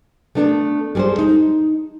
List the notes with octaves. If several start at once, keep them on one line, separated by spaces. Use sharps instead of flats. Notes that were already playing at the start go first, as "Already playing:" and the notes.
A3 B3 D4 A4
G3 G#3 G#4 A4 C5
D#4